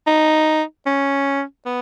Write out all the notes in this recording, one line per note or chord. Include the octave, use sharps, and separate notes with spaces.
D#4
C#4
B3